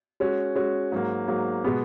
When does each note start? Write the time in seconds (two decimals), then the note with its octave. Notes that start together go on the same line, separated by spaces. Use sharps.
0.20 G#3 C#4 F#4
0.56 G#3 C#4 F#4
0.92 G#2 F#3 A#3
1.28 G#2 F#3 A#3
1.64 B2 G#3 B3